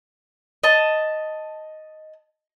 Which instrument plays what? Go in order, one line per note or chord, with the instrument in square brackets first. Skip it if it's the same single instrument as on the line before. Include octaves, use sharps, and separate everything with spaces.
[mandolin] D#5 A5